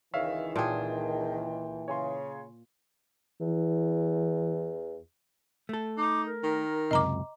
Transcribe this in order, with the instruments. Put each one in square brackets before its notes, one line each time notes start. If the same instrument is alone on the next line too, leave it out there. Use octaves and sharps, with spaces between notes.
[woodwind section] C#2 D#3 [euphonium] E3 [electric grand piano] C#5 E5 F5
[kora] A#2 G#4 [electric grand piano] G5 A5 C6
[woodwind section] C#3 [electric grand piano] C#5 G#5 C6
[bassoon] E2 [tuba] E3
[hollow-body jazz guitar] A3 A4
[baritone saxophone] D#4 [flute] D6
[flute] A#4
[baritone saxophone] D#3
[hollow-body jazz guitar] C#2 F#2 C3 [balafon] D#5 A#5 D6